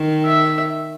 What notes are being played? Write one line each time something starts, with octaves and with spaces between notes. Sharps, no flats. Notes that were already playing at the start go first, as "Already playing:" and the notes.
Already playing: D#3
E5